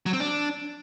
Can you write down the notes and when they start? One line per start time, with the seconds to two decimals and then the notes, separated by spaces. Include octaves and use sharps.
0.06 F#3
0.13 C4
0.20 D4